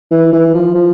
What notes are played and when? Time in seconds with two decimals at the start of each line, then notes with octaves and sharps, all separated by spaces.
0.11 E3
0.32 E3
0.54 F3
0.75 F3